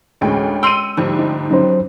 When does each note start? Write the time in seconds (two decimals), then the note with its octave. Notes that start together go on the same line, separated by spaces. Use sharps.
0.21 A1 D2 G#3 C#4 G5
0.63 G5 C6 E6 C#7 D#7
0.97 D2 G#2 F3 G3
1.19 D#4
1.51 F#3 C#4 D#4 C5